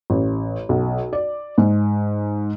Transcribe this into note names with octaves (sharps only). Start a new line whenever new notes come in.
A1
B1
D5
G#2